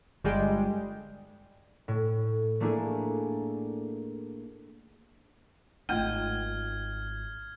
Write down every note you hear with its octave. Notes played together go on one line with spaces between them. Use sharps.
G1 G3 G#3 G5
A2
A3 A#3 D4 E4 G#4
D1 G#1 A3 D#4 F4 G5 F6 G#6